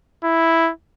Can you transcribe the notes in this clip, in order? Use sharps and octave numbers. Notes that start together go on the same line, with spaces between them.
E4